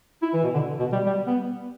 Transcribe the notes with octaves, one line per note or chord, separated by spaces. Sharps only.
E4
E3
B2
D3
B2
G3
G3
B3